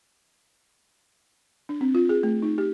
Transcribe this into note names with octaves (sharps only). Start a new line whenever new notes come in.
D4
C4
F4
G#4
A3
D#4
G4